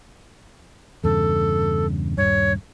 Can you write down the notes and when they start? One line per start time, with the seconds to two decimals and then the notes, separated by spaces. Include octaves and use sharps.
1.04 E2 G2 C#3 A4
2.18 D#1 G2 C#5